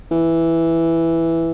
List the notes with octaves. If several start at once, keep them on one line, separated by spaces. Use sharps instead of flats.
E3